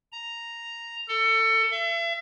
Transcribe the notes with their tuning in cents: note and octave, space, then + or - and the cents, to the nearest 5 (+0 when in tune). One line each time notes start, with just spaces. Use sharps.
A#5 +0
A4 +25
E5 +40